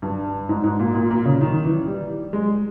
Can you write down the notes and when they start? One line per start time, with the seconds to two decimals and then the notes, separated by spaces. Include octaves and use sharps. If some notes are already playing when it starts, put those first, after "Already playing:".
0.02 G2
0.49 G#2
0.64 G#2
0.79 A#2
0.95 A#2
1.10 A#2
1.25 C#3
1.41 D#3
1.64 E3
1.87 G3
2.33 G#3